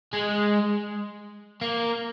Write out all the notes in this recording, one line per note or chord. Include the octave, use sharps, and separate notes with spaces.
G#3
A#3